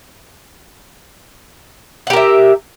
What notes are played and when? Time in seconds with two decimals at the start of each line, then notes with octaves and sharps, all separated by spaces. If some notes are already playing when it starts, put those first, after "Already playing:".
2.07 F#5
2.10 G4
2.13 A#4
2.16 E5